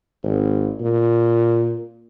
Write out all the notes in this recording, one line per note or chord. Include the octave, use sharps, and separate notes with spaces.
G#1
A#2